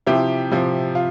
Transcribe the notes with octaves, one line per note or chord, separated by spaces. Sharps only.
C3 F3 E4 G4
C3 F3
F4